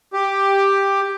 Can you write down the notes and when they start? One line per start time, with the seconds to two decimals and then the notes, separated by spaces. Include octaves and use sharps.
0.13 G4